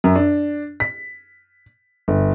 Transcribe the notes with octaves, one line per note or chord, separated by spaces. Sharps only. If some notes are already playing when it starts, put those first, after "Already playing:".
F#2
D4
B6
G1